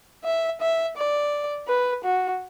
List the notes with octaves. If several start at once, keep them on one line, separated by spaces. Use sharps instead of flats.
E5
E5
D5
B4
F#4